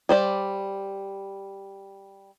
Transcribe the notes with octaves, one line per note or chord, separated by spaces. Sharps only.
G3 C5 D5